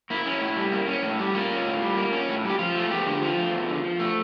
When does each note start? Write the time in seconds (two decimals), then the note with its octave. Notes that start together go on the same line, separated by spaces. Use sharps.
0.10 A#3 E4
0.26 C#4
0.41 A2
0.57 G3
0.72 A#3
0.88 C#4
1.03 A2
1.19 G3
1.34 A#3 F4
1.51 C#4
1.67 A2
1.82 G3
1.97 A#3
2.13 C#4
2.29 A2
2.44 G3
2.50 G4
2.59 F3 F4
2.75 A3
2.91 E2 G4
3.06 D3
3.21 F3 F4
3.38 A3
3.54 E2
3.68 D3
3.84 F3
4.00 A3